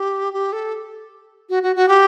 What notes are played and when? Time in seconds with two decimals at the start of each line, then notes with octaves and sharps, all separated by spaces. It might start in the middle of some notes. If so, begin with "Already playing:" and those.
Already playing: G4
0.34 G4
0.53 A4
1.49 F#4
1.63 F#4
1.76 F#4
1.89 G4